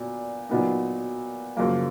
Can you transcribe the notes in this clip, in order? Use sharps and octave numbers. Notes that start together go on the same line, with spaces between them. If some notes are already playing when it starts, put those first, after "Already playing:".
Already playing: A#2 F#3 B3 D4
A#2 F#3 B3 D#4
F#2 C#3 F3 A#3